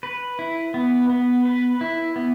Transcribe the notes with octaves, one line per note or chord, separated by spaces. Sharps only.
B4
E4
B3
B3
B4
E4
B3